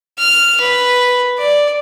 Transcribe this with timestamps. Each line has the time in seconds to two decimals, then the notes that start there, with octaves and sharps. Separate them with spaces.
0.18 F6
0.61 B4
1.38 D5